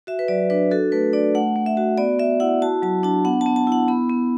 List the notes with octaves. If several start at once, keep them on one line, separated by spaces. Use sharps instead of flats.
F#4 E5
B4
F#3 D5
D4 B4
F#4 A4
A3 B4
D4 D5
A3 F#5
A3
E5
F#4
B3 D5
B3 E5
E4 F#5
F#4 A5
F#3 A5
D4 A5
B3 F#5
A5
B3
A5
E4
F#5
B3 B5
B3